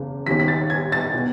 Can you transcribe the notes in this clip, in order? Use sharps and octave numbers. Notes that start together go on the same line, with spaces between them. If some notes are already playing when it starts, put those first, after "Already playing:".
Already playing: F#1 E2 C#3
D#2 D#3 B6
B6
A6
G#6
A6
B2